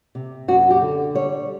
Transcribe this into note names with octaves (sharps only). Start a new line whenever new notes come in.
C3
F#2 F#4
G4
D3
G3 C#5